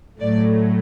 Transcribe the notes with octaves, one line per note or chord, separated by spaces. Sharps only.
A2 F#3 A3 D5